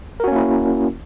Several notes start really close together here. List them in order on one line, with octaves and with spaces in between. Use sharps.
A#4 F#4 C#4 A#3 E4